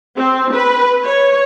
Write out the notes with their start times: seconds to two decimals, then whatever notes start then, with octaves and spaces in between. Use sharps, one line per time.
0.17 C4
0.53 B4
1.04 C#5